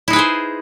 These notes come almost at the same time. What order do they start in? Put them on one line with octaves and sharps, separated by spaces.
E4 D#4 B4 G#4 C5